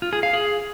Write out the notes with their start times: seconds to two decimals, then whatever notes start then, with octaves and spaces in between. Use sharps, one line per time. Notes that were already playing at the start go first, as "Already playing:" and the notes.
0.02 F4
0.13 G#4
0.23 F5
0.33 G#4